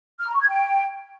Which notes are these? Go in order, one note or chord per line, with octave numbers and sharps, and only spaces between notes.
F6
A#5
C#6
G#6
G5